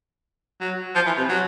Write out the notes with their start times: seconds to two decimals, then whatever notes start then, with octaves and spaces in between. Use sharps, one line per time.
0.61 F#3
0.95 F3
1.06 E3
1.18 C3
1.29 F#3